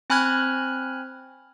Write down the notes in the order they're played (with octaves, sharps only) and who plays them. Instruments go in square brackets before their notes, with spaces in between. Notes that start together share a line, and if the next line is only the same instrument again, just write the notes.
[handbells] C4 G#5 B5 F6 F#6 G#6